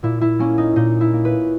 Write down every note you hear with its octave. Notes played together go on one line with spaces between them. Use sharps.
A#2 E4
E4
A#3 C#4
D#4
A#2 D#4
E4
A#3
B4